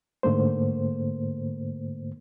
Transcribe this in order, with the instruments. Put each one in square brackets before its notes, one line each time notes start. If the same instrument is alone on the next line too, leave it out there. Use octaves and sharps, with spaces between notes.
[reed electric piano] G#2 D3 A3 A#3 C5